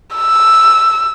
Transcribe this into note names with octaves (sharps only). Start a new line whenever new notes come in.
E6